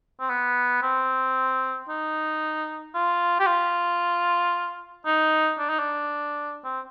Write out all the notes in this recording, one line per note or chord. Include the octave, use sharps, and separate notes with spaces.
C4
B3
C4
D#4
F4
G4
F4
D#4
D4
D#4
D4
C4